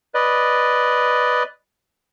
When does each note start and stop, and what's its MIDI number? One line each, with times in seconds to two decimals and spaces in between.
0.14 1.43 71
0.14 1.43 74
0.14 1.43 75